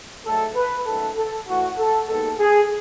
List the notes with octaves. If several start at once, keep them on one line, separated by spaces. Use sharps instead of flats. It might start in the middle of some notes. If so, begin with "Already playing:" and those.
G#2 F#3 A3 A4
B4
F#2 D#3 A3 A4
A4
A2 E3 A3 F#4
A4
D#2 D#3 G#3 B3 A4
G#4